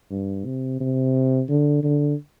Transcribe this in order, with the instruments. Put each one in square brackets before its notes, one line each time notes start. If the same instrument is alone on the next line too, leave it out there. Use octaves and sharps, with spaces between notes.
[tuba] G2
C3
C3
D3
D3